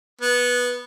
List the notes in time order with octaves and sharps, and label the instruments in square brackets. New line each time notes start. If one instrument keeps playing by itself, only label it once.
[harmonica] B3